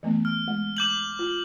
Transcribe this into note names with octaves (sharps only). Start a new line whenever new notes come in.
E3 A3 B3
F6
G#3
D6 G6 F#7
F4